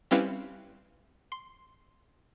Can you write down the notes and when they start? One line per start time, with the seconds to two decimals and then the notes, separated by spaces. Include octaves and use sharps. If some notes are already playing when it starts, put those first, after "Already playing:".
0.11 G3 C4 C#4 E4 B4 F5
1.32 C6